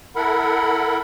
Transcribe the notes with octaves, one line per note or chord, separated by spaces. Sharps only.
E4 A4 A#4 F#5 B5